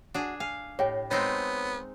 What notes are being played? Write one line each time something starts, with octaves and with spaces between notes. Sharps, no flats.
D4 F#4 G#4 G#5
F5 G#5
A2 G4 C#5 D#5 G5
G#3 B3 C4 D#4 C#5